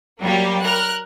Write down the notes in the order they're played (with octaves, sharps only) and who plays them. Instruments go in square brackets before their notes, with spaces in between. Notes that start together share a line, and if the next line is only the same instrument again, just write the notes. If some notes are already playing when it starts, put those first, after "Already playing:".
[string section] F#3 G3 A#3 G4
A#4 F6 F#6